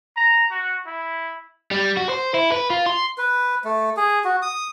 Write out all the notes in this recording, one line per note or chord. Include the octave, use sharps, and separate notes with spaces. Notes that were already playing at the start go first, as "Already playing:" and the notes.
A#5
F#4
E4
G3
F#4
C5
E4
B4
F4
C6
B4
A3
G#4
F#4
D#6